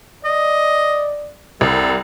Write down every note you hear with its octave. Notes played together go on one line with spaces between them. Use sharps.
D5 D#5
C2 G3 A4